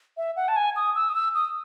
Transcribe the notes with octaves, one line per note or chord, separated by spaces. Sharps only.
E5
F#5
A5
G#5
D#6
E6
D#6
E6
D#6